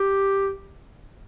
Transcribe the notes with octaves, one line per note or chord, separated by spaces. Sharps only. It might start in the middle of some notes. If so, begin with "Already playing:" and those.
Already playing: G4